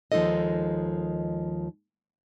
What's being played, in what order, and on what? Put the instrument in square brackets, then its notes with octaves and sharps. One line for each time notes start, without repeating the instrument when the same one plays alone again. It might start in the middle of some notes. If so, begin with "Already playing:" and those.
[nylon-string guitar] D#2 F3 G#3 D#4 A4 D#5